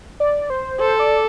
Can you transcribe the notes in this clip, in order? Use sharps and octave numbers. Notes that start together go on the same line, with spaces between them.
D5
C5
A4 C5
D5